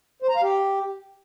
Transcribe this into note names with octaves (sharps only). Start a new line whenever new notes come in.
C5
A#5
F5
G4